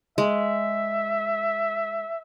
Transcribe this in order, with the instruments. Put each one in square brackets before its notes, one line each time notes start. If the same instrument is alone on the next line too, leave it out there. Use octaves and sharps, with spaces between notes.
[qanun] G#3 [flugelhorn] E5